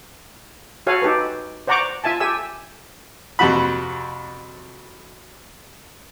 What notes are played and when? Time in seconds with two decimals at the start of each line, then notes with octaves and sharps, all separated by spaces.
0.87 F#4 A4 C#5 F5 F#5 G#5
1.02 D#4 G4 A4 B4
1.67 C5 D5 F#5 A#5 C#6 D6
2.04 F4 E5 G#5 A5
2.20 G4 A4 E5 G#5 E6
3.39 F2 C3 F#4 B5